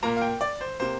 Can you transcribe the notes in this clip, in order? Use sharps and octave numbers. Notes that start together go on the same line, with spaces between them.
A#2 A#3 A#5
F5
G5
D5
C5
C3 A#3 C5